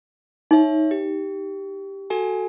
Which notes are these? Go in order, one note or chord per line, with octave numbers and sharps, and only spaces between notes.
D#4 C#5 E5
G4
F#4 A4 G#5